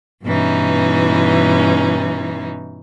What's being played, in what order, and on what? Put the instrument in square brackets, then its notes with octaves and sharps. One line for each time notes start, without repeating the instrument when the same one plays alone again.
[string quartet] G2 B2 E3 C#4 D#4 E4